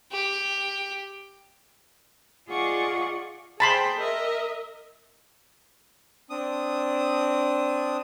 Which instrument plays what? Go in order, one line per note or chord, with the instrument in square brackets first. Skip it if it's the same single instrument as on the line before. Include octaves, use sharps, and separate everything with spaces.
[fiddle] G4
[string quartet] F4 G#4 D5 D#5 F#5 C#6
[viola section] G#4 C5 G5 [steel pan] A5 B5 C6
[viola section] A#4 D#5 E5
[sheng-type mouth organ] C4 D4 D#6